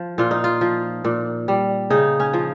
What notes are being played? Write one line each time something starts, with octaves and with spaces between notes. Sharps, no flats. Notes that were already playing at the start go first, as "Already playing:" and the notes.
Already playing: F3
A#2 F4
D#4
F4
F3
A#2
G3
C#3 D#4
C#4
F3